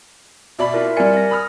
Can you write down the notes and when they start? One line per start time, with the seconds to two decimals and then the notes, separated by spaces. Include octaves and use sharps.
0.59 B2 D5 E5 B5
0.74 E4 F4 A#4
0.96 G3 A#4 D5 G#5 C#7
1.17 A#6
1.31 B5 D#6 F6